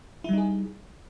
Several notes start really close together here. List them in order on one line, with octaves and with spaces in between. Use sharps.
E4 G3 D#4 G#4